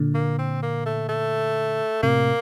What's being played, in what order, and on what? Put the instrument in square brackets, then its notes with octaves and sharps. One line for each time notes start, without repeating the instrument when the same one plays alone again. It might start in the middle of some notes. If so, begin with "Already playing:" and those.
Already playing: [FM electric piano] A#2 D3
[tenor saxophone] A#3
C4
A#3
A3
A3
[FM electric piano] A2 C3 [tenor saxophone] A#3